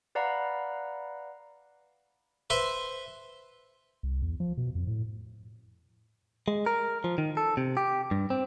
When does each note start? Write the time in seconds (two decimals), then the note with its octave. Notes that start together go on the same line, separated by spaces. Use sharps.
0.15 B4 D5 F5 F#5 A#5 B5
2.50 B4 C5 E5 C6
4.03 C2
4.22 E2
4.40 F3
4.57 B2
4.75 F2
4.87 A2
6.48 G#3
6.66 A#4
7.04 F3
7.18 D#3
7.37 A4
7.57 C3
7.77 G4
8.11 G2
8.30 C4